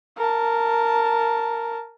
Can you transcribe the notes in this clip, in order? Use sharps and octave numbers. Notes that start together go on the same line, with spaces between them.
A#4 A5